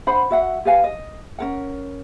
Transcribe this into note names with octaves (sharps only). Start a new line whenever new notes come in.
D4 C5 F#5 B5
F#4 E5 F#5
G4 B4 F5 G#5
D#5
C#4 A#4 F#5